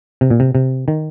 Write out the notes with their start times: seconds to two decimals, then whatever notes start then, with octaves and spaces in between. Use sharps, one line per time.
0.21 C3
0.30 A#2
0.40 C3
0.55 C3
0.88 D#3